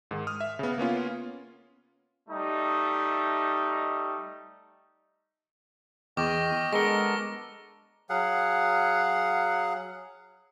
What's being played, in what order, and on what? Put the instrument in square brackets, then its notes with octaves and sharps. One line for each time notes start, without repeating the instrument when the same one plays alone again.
[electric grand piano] G#2 D#3
D#6 F6
E5
C#3 B3
A#3 B3 C#4 F4
[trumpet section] G3 A3 D#4
[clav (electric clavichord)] E2 [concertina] D#5 G5 F6 [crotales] C#6 D6
[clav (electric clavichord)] G#3 [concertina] B3 [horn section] D4 A4 A#4 [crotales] A#6 G7
[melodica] F#3 G#4 F5 F#5